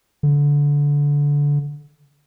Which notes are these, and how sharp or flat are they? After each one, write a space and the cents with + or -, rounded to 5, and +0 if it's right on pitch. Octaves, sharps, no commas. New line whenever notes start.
D3 -20